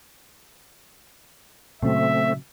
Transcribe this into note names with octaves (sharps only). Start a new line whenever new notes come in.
A#2 C#3 F#3 A3 C4 E5